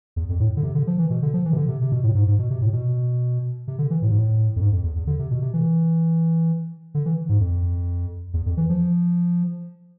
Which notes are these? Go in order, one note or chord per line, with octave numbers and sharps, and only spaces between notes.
E2
F2
A2
D3
C3
D3
F3
E3
B2
D3
F3
E3
C3
D3
C3
C3
B2
A2
G#2
G#2
B2
C3
A2
B2
C3
D3
E3
A2
G#2
A2
F2
G#2
F2
E2
E2
D3
C3
B2
C3
E3
D3
E3
G#2
F2
E2
F2
E3
F3